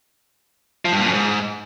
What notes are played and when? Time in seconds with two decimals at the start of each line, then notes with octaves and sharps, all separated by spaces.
0.85 F3
0.92 G2
0.99 A#2
1.06 F#2
1.13 G#2